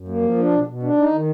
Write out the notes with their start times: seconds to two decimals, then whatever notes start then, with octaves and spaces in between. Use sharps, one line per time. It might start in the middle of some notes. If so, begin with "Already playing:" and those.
Already playing: F#2
0.08 A#3
0.22 F3
0.38 D4
0.53 B2
0.67 B2
0.83 D4
0.98 D#4
1.13 D#3